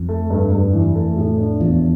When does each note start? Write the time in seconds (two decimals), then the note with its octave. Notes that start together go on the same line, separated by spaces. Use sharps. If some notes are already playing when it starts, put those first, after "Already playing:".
Already playing: F2
0.09 A3
0.30 G2
0.52 G2
0.73 E3
0.95 A3
1.17 A2
1.38 D4
1.60 E2 F3